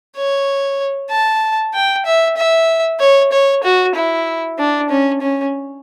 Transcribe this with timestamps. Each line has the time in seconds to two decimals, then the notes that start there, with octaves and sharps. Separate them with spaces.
0.16 C#5
1.10 A5
1.74 G5
2.05 E5
2.37 E5
3.00 C#5
3.32 C#5
3.63 F#4
3.95 E4
4.58 D4
4.89 C#4
5.21 C#4